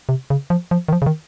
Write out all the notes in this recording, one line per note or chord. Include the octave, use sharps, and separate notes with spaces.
C3
C#3
F3
F3
D#3
F3
C#3
D#3